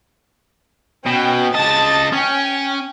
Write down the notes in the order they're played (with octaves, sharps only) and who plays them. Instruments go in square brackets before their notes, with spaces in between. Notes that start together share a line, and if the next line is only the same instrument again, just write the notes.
[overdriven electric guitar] B2 [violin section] C#4 G5
[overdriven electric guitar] C#3 D#5 [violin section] A5 A6
[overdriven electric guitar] C#4 [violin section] G5 G#5